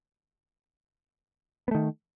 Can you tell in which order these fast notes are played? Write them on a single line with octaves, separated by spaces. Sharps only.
B3 A3 D#3